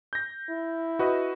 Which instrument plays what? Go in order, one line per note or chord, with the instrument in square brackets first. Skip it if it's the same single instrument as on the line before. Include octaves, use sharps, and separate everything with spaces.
[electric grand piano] G6 A#6
[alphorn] E4
[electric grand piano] F#4 B4 D#5